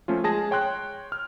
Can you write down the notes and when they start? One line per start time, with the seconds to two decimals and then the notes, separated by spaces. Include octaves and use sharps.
0.08 F3 A3 C#4 F4
0.24 G#3 G#4 A5 A#6
0.51 C#5 G5 C6 F#6
1.12 F6